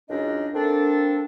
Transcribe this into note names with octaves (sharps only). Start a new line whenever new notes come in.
C#2 F#2 D4 D#4 D#5
A#3 C4 D4 A4